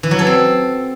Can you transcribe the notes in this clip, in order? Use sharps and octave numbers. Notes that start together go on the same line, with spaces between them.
E3
F#3
A4
C4